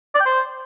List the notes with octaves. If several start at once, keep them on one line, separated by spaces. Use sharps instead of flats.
D5
G5
C5